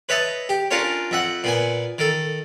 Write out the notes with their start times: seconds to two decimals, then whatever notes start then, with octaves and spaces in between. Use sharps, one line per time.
0.09 B4 C#5 D#5 E5 A5
0.49 G4
0.71 C#4 D4 F4 A#4 C#5
1.11 F2 E5 F#5
1.44 A#2 B3 G#5
1.98 D#3 A4